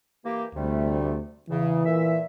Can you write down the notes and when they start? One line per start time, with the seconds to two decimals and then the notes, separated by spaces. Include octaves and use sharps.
0.25 E3 A#3 G4
0.55 D2 C3 G3 A3
1.49 E2 C#3 E3
1.86 A#2 E5